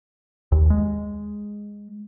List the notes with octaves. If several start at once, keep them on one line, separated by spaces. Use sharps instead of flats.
D#2
G#3